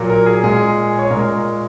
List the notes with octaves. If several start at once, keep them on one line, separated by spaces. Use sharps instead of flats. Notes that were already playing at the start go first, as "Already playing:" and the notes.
Already playing: A#2 F#3 A#3
A#4
G#4
A#2 G#3 G#4
C#5
A#2 G#3 A#4